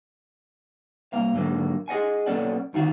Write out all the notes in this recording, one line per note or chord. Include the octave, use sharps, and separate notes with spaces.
C2 A#3 F5
G#2 D3 F#3 A#3
G#4 D#5 F#5 G#5
B1 A#3 C#4 A4 D5 F#5
D2 D#3 F4 F#4